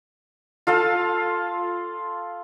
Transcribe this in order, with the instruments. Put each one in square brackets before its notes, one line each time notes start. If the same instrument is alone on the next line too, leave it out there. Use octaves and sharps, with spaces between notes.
[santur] F4 A4 F5 A5